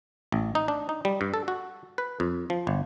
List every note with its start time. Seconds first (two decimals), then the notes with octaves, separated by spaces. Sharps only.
0.32 A1
0.55 D#4
0.68 D4
0.89 D#4
1.05 G3
1.21 G2
1.34 A4
1.48 F#4
1.98 B4
2.20 F2
2.50 F3
2.67 G1